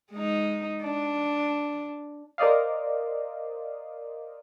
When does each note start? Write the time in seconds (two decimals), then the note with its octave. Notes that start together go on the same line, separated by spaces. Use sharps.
0.11 G#3 D#4
0.82 D4
2.38 A#4 C5 D5 D#5 F5